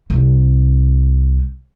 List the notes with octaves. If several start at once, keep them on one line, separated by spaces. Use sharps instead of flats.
C2 C3